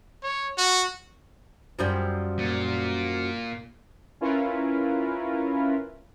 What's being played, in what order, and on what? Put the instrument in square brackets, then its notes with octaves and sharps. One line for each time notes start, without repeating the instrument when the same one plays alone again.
[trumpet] C#5
F#4
[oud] F#2 F3 G3
[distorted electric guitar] A#2
[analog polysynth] C#4 E4 F4 A#4 B4